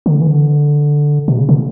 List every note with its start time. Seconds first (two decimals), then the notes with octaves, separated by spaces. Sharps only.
0.06 D3
0.21 E3
0.27 D3
1.28 B2
1.38 C#3
1.49 C#3